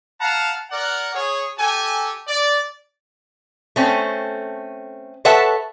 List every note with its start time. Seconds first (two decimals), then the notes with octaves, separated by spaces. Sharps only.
0.21 F5 F#5 A5 A#5
0.71 A#4 D5 F#5
1.14 G#4 C#5
1.57 G4 A4 G#5
2.28 D5
3.76 A3 C4 C#4
5.25 A4 B4 C#5 E5 F#5 A5